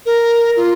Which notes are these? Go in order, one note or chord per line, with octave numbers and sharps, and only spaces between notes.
A#4
F4